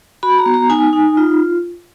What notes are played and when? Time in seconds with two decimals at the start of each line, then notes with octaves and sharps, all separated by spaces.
0.23 F#4 B5
0.38 A#5
0.46 B3
0.54 A#5
0.69 D#4 G#5
0.93 D#4
1.17 F4